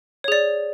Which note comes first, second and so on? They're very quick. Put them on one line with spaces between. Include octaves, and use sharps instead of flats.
C#5 G#4 D5